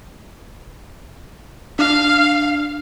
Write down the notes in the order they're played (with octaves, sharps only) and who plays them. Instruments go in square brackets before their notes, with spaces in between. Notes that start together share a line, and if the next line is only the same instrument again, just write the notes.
[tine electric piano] D4 [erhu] F5